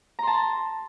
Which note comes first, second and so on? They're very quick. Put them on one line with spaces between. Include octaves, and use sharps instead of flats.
A#5 C6 A5